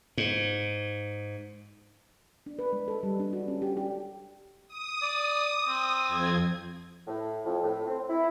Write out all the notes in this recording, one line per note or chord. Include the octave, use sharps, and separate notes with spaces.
G#2
D4
B4
G#3
A4
G3
D4
F#4
C#4
G4
G4
D#6
D5
C4
F2 G#6
A2
F2
A2
C4
E4